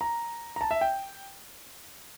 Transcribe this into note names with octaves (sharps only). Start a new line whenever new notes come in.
A#5
A#5
A5
E5
G5